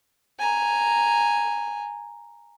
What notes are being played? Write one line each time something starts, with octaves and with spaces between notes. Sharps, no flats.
G#5 A#5